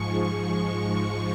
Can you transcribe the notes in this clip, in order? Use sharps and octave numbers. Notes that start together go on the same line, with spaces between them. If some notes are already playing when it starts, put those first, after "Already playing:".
Already playing: G#2 F3 G#3 C#6